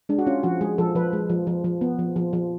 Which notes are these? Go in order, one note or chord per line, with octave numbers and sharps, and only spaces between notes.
G#3 D4
F#4
C#4 F4
F3 F#4
G#3 G#4
F3 A4
F3 B4
G#3
F3
F3
F3
B3
F3
F3
F3